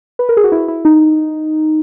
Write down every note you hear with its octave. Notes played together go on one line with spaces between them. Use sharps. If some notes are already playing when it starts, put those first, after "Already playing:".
B4
A#4
G#4
F#4
E4
E4
D#4